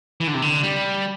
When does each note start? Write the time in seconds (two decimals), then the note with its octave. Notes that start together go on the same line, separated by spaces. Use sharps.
0.20 E3
0.27 D3
0.34 C3
0.42 D3
0.63 G3